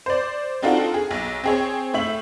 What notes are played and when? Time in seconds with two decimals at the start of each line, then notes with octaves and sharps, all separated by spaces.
0.06 C5 D5
0.62 C4 D4 D#4 F4 F#4 A4
0.94 G#4
1.11 B1
1.44 C4 G#4 C#5
1.94 A2 E5 F#7